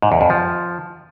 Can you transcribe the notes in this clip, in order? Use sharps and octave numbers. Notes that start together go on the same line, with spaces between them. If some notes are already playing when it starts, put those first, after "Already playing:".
G#2
E2
F2
F3